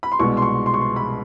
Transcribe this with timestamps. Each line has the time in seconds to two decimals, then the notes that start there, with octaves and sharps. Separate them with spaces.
0.03 B5
0.12 C6
0.19 C2 B2 G#3 C#6
0.37 C6
0.42 C#6
0.66 C6
0.74 C#6
0.81 C6
0.96 B5